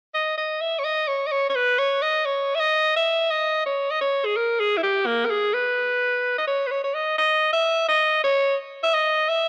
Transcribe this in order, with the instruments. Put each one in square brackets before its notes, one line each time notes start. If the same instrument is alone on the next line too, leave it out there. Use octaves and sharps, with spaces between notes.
[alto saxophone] D#5
D#5
E5
C#5
D#5
C#5
D#5
C#5
C#5
B4
C#5
D#5
C#5
E5
D#5
E5
D#5
C#5
D#5
C#5
G#4
A#4
G#4
E4
G4
A#3
A#4
G#4
B4
D#5
C#5
B4
C#5
C#5
D#5
D#5
E5
D#5
C#5
E5
D#5
E5